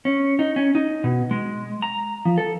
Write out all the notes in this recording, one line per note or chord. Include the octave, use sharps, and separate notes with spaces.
C#4
D#4
C#4
D#4
B2
G#3
A#5
F3
A4